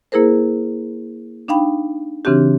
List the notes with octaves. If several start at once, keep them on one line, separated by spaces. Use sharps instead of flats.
A#3 E4 G#4 A#4 C5
D4 D#4 F5 G5 B5
C#3 E3 C4 D4 F#4 G4